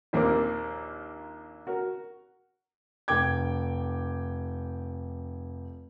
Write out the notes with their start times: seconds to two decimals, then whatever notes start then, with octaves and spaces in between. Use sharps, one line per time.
0.13 A#1 D#2 A#3 C4 A#4 D6
1.67 F#4 A#4
3.08 F1 G5 D6 G#6